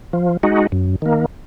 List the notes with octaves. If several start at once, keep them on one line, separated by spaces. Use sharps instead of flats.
F3
G#3 D#4 F#4
F#2
D#3 A#3